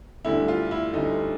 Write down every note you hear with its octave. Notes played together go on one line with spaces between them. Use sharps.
D2 D3 G3 E4
F4
E4
D2 D3 G3 D#4